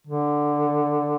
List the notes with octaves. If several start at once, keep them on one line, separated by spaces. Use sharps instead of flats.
D3